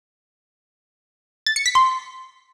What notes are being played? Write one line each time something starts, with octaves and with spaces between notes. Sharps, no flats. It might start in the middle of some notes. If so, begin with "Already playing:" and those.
A6
C#7
B6
C6